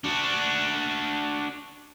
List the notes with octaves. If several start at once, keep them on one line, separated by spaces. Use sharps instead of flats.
D4 F#4